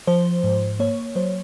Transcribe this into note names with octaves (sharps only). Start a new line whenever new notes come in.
F3 C5
G#2
A#3 C#5
F#3 C5